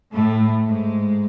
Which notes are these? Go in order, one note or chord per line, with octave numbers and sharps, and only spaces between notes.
A2 A3
G#2 G#3